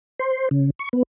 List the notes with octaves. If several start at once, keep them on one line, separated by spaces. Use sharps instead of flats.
C5
C#3
C#6
B3